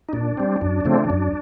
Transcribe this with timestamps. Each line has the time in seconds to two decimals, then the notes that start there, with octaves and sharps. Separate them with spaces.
0.09 D#4
0.13 A#2 D4
0.37 G3 C4
0.61 F#2 D4
0.85 C#3 F3 A3 C4
1.10 F#2